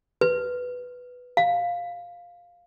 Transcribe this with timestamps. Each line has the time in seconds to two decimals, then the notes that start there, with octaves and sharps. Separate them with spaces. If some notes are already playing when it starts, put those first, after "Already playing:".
0.21 B4
1.37 F5